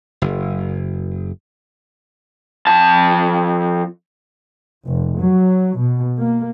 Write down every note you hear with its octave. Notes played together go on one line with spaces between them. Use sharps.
F#1
F2 A5
F1
F#3
B2
A#3